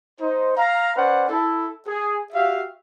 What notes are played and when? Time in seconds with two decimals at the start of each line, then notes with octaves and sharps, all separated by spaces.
0.20 D#4 C5
0.56 F5 A#5
0.96 C#4 B4 C5 D5 F#5
1.29 E4 A4
1.88 G#4
2.33 F#4 G4 E5 F5